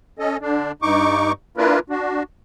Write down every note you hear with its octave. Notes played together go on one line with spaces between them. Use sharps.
C#4 A4 D#5
D3 D4
G2 D#4 C#6 D6
A#3 D4 E4 F4 A#4 B4
D4 F#4